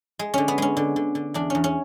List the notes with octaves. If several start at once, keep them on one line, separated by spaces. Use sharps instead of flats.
G#3
D3 C#4
B3
G#3 C#4
D3
D3
D3
E2 D4
E2 C#4
C#4